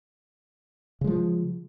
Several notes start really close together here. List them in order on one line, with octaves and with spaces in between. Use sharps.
C#3 G#3 F3